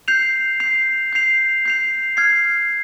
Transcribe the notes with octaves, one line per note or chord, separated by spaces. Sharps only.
G6 C7 F7
G6 C7 F7
G6 C7 F7
G6 C7 F7
F6 G#6 C7